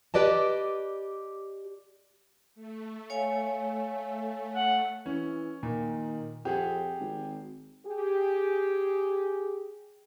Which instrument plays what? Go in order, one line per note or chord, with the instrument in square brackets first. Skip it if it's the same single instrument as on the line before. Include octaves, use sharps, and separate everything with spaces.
[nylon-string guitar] G4 B4 D5 D#5 A5
[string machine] A3
[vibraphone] C#5 F5 G#5
[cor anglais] F#5
[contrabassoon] E3 [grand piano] C#4
[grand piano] A#2 [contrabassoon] D#3
[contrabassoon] F2 [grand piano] G4 G#4 F#5
[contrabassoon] G#1
[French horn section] G4 G#4